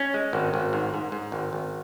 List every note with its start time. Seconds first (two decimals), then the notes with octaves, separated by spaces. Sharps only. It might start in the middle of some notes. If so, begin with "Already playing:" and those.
Already playing: C#4
0.14 G#3
0.33 G#1
0.54 G#1
0.73 G#2
0.94 G#2
1.12 G#2
1.32 G#1
1.53 G#1